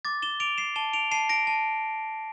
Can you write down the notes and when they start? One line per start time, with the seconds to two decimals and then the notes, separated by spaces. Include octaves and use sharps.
0.05 D6 A6
0.22 E7 G7
0.40 D6 D7 F7
0.58 C7 E7
0.76 A5 E7 G7
0.93 D7 F7
1.11 A5 C7 E7
1.29 A#6 D7
1.47 A5